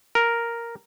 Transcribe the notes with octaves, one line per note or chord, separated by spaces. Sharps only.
A#4